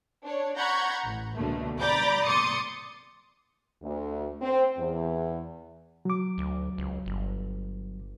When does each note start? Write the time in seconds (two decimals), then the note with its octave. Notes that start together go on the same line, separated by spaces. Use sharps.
0.25 D4 C#5
0.57 F#5 A#5 B5 C#6 G6 G#6
1.04 A1
1.35 C#2 B2 D3 A3 A#3
1.79 D5 A#5 B5 D6 G6 A6
2.25 C6 D6 D#6 A6 C#7
3.83 D2
4.42 C4
4.78 E2
6.05 F#3 D6
6.38 D2
6.78 C#2
7.06 G1